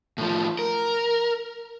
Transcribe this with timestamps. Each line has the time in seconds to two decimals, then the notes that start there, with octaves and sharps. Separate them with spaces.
0.18 A2 F3
0.59 A#4